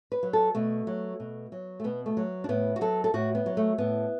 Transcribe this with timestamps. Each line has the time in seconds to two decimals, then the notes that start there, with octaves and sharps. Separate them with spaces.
0.12 B4
0.23 F#3
0.33 A4
0.55 B2 A3
0.87 F#3
1.20 B2
1.52 F#3
1.80 A3
1.84 B2 B3
2.06 A3
2.17 F#3
2.44 D4
2.49 A2 B3
2.76 F#4
2.81 F#3 A4
3.04 A4
3.14 A2 F#4
3.35 B3
3.46 F#3
3.57 A3
3.78 A2 B3